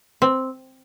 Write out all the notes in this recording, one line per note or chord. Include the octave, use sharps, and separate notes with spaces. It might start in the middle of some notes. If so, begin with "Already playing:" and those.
C4